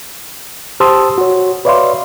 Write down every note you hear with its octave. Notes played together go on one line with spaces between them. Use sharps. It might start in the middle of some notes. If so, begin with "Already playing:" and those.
G4 C5 A5 C6 D#6 E6
F#4 C#5
B4 C#5 D5 E5 F5 C6